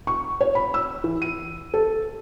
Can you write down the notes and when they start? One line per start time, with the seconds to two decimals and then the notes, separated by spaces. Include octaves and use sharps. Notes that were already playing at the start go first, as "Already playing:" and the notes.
0.07 C#6
0.41 C#5
0.55 B5
0.74 E6
1.04 E3
1.22 D#7
1.74 A4